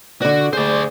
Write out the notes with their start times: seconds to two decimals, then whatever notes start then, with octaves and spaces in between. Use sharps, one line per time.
0.22 D3 F#4 D5
0.53 D2 G#4 C5 D5